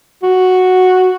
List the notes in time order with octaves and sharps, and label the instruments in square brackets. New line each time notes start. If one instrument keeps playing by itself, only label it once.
[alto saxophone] F#4